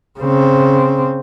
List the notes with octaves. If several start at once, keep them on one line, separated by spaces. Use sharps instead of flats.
C#3 C4